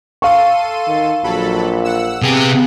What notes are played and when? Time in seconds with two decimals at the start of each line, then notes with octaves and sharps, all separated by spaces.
0.22 A4 F5 C6 C#6 D#7
0.88 D#3
1.24 A#1 F#3 A4 B5
1.84 F#5 E6
2.22 C3 B3 G4 G#4 F#6